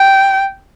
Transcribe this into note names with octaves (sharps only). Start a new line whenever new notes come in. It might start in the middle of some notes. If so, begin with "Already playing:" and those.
Already playing: G5